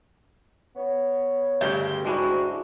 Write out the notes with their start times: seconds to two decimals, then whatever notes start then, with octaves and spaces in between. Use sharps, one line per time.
0.76 B3 C#5
1.61 D2 G2 C#3 G5
2.05 D2 G#2 G#3 D4 E4 F#4